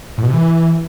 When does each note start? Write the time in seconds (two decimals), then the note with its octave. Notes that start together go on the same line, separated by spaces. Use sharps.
0.18 A2
0.23 B2
0.28 C3
0.33 E3